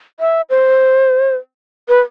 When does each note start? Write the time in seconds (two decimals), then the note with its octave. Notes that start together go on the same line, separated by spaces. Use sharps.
0.20 E5
0.50 C5
1.89 B4